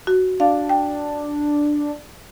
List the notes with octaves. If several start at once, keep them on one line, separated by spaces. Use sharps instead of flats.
F#4
D4 F5
G5